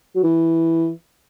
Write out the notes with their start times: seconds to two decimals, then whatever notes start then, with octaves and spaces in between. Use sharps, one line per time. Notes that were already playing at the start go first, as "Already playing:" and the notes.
0.15 F#3
0.23 E3